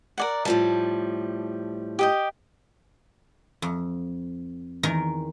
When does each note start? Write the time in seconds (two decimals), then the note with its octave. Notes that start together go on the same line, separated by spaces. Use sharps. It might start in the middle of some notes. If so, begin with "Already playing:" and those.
0.18 A#4 D5 F#5
0.45 A2 F3 G3 A5
1.99 G4 D#5 G5
3.62 F2
4.83 E2 D#3 A#4 A#5